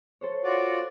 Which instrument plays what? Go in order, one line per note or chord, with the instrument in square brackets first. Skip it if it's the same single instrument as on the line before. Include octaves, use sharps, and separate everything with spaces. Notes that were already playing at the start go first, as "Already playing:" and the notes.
[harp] A4 C5 C#5
[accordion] F4 F#4 D5